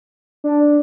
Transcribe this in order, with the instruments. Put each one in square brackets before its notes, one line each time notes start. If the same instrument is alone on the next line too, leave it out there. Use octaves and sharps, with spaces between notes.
[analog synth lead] D4